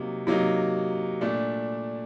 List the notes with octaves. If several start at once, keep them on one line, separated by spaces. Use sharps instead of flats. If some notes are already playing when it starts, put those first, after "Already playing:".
Already playing: C3 F#3 A#3 D#4
C3 F#3 A#3 D#4
A#2 A3 D4